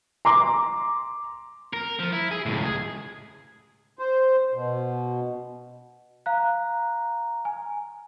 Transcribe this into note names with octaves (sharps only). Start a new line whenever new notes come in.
A#5 C6 D6
A#4
F3
E4
G#4
C#2 A2
G#4
C5
B2
F5 A#5 F#6
G#5